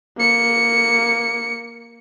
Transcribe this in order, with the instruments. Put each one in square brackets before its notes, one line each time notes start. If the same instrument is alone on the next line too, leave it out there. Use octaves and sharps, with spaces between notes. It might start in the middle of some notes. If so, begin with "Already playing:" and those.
[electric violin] A#3 C#7